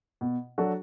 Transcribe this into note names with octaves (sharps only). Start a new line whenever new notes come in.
B2
F#3 D4 F#4 A4